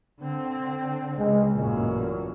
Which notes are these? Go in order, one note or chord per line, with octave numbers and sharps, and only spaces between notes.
D3 C4
C#2 G#3
A1 F#2 A#2